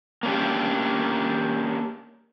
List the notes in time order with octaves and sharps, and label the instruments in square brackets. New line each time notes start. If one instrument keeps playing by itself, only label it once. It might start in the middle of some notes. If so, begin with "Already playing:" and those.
[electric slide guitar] A#3 C#4 D4 G4